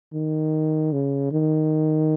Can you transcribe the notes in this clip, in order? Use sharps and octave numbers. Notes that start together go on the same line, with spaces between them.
D#3
C#3
D#3